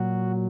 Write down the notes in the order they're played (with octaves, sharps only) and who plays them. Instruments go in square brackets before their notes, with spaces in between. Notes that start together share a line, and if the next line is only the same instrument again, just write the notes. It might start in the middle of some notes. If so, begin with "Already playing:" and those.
Already playing: [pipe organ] A#2 F#3 F#4